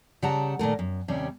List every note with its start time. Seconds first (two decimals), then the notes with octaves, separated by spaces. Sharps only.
0.22 C#3 G3 F#5 A5 A#5
0.59 A#2 D#3 A3 A#4
0.79 F#2
1.08 D#2 C3 G3 C#4